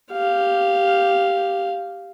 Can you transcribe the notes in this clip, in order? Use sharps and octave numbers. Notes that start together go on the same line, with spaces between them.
G4 F5